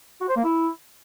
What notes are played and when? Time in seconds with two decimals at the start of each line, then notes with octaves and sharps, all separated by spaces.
0.21 F#4
0.29 C5
0.36 A#3
0.44 E4